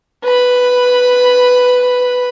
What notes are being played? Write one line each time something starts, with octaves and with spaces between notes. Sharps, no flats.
B4 B5